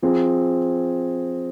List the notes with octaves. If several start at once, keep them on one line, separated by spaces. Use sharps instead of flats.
F3 C4 G#4